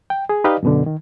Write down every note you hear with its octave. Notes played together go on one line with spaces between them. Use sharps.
G5
G#4
D#4 G4 B4 D5 D#5 F5
F#2 B2 D3
D#3